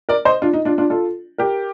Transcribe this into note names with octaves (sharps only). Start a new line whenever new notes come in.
A#4 D5
C5 D#5
D4 F4
D#4
D4 F4
D4 F4
F4 A4
G4 A#4